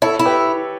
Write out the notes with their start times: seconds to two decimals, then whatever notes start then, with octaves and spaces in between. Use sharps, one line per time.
0.02 E4 A4 C#5
0.19 E4
0.25 G4 B4